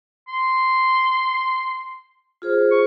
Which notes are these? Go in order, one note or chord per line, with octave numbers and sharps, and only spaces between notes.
C6
F4 G#4 C5
C#6